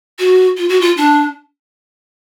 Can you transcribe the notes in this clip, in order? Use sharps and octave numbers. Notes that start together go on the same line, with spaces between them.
F#4
F4
F#4
F4
D4